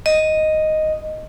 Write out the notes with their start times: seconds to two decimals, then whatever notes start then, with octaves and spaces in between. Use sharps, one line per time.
0.06 D#5